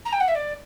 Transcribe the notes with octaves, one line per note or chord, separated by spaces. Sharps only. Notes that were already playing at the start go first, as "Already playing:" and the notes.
A#5
G5
F#5
E5
D5